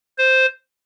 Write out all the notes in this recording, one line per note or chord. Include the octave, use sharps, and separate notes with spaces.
C5